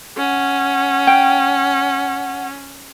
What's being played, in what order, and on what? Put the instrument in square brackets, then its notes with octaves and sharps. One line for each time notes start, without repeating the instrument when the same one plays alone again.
[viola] C#4 [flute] F#5
[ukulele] G5